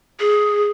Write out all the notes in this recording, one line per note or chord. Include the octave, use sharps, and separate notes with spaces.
G#4